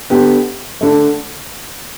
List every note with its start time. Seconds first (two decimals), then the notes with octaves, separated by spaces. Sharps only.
0.10 D3 B3 G4
0.81 D3 A3